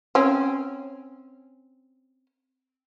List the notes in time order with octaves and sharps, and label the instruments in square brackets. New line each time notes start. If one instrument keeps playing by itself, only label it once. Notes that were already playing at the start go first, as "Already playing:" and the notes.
[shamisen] C4 C#4